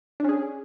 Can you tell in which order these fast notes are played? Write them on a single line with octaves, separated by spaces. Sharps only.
D4 C#4 G#4